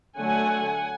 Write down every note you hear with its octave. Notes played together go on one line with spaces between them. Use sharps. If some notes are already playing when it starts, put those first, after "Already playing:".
D3 F#3 A3 F#5 G#5